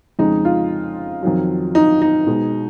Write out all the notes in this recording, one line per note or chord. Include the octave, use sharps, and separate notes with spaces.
F2 C#3 G#3 D#4
F4
F2 D#3 F#3
D#4
D#4
B2 G#3